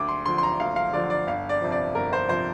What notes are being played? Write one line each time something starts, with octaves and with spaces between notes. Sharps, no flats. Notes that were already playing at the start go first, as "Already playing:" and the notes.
Already playing: D2 D6
C6
D3 F3 C6
C6
A#5
D2 F5
F5
D3 F3 D5
D5
G1 F5
D5
F2 C3 F3
D5
G1 A#4
C5
C3 F3 C5